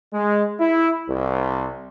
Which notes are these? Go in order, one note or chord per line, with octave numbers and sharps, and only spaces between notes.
G#3
E4
C2